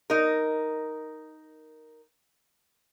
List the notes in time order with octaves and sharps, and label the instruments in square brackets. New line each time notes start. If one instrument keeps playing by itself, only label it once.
[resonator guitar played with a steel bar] D#4 A#4